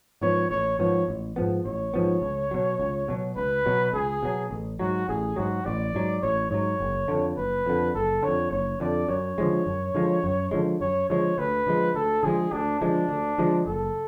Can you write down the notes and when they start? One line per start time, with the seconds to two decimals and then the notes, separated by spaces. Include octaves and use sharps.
0.22 G#2 F3 B3 C#5
0.51 A1 C#5
0.79 G#2 F3 B3 C#5
1.08 A1
1.36 G#2 F3 B3
1.66 A1 C#5
1.94 G#2 F3 B3
2.22 C#2
2.51 B2 F#3
2.80 C#2
3.08 B2 F#3
3.37 C#2 B4
3.66 B2 F#3
3.93 C#2 G#4
4.23 B2 F#3
4.51 A1
4.79 G#2 F#3 F#4
5.08 A1 G#4
5.36 G#2 F#3 F#4
5.65 A1 D5
5.95 G#2 F#3
6.22 A1 C#5
6.51 G#2 F#3 C#5
6.80 F#1
7.08 F2 D3
7.37 F#1 B4
7.66 F2 D3
7.94 F#1 A4
8.23 F2 D3 C#5
8.51 F#1 C#5
8.80 F2 D3 D5
9.09 F#2 C#5
9.38 D3 F3 G#3
9.66 F#2
9.95 D3 F3 G#3
10.24 F#2
10.51 D3 F3 G#3
10.81 F#2 C#5
11.09 D3 F3 G#3 C#5
11.38 D2 B4
11.66 D3 F3 G#3
11.95 D2 A4
12.23 D3 F3 G#3 G#4
12.52 D2 D4
12.80 D3 F3 G#3 D4
13.09 D2
13.38 D3 F3 G#3
13.66 F#1 A4